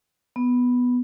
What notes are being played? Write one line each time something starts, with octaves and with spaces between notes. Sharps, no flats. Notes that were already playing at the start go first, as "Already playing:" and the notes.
B3